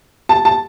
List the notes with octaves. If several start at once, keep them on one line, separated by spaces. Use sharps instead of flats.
A5
A5